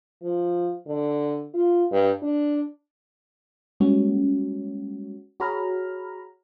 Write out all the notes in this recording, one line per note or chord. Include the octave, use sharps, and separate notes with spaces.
F3
D3
F4
G2
D4
G3 G#3 A#3 C#4 F#4
F#4 G#4 C#5 A#5 B5 F6